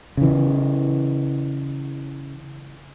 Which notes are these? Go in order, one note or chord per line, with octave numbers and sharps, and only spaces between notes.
C#3 E3